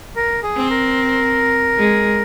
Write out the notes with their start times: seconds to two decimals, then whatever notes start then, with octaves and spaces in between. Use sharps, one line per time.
0.16 A#4
0.43 G#4
0.57 C4
0.70 A#4
1.78 G#3